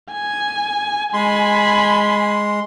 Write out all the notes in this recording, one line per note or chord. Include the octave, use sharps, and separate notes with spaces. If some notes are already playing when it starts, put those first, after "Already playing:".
G#5
G#3 G#5 B5 C6